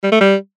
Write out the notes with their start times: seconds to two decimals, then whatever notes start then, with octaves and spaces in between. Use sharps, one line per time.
0.04 G3
0.12 A3
0.21 G3